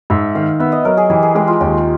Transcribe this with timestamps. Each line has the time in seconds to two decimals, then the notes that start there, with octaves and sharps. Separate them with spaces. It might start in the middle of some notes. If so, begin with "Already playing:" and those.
0.10 G#2 E5
0.35 D#3 F5
0.59 B3 E5
0.72 D#5
0.85 F#3 A#4
0.97 G#4
1.10 E3 G4
1.23 G#4
1.35 G#3 G4
1.48 F4
1.61 D#2 G4